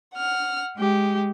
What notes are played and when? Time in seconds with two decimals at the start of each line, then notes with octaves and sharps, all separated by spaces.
0.14 F#5 F6
0.77 G#3 G4